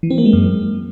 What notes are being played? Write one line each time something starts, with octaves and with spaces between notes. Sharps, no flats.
E3
C4
A#3
G#3
F#2